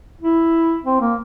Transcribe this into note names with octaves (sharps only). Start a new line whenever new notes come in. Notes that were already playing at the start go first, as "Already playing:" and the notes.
E4
C4
A#3